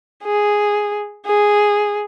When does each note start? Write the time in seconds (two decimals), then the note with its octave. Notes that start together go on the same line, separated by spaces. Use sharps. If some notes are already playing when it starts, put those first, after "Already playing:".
0.24 G#4
1.26 G#4